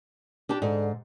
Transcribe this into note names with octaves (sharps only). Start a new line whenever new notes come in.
D4 G4 A5
G#2 D3